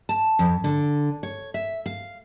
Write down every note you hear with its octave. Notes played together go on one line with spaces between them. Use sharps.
A5
F2
D3
C#5
E5
F5